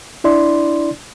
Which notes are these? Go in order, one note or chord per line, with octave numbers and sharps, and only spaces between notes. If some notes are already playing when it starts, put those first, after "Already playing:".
D4 E4 D5 C6